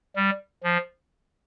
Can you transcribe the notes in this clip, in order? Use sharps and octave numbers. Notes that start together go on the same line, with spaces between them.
G3
F3